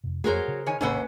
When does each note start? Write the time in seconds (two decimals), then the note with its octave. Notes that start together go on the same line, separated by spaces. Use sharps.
0.04 F2 C3
0.24 F2 F#3 A#3 F#4 G#4 A#4 C5 C#5
0.48 C#3
0.66 D#3 C#5 G#5
0.81 G#1 D#2 C3 C#4 A4 B4 C5 F#5